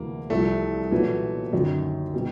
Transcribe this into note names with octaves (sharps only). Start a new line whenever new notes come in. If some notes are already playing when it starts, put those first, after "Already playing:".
Already playing: D2 C3 E3 G#3 A#3
C2 C3 F3 A3
B1 A#2 E3 F#3 B3
F#2 D3 D#3 F#3
B2 G3